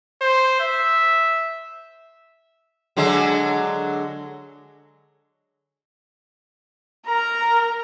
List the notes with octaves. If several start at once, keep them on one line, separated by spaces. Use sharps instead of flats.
C5
E5
D3 F#3 G#3
A#4 A#5